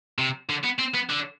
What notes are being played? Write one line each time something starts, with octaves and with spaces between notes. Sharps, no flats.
C3
D3
B3
C4
B3
D3